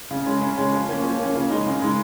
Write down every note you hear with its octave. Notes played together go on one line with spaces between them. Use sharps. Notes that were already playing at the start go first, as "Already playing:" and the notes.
C#3
G#3 C#4
C#3
G#3 C#4
F3
A#3 C#4
F3
A#3 C#4
C#3
G#3 D#4
C#3
G#3 D#4